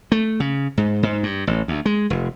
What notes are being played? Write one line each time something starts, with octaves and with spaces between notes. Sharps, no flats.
A3
C#3
G#2
G#2
G2
A1
D2
G#3
F1